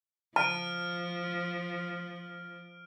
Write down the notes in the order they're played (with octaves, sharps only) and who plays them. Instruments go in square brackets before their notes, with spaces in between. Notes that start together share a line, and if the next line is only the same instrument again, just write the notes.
[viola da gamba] F3 [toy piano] A5 [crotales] F6 D7